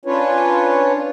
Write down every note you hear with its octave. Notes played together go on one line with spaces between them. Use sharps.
C#4 D4 F4 B4 C#5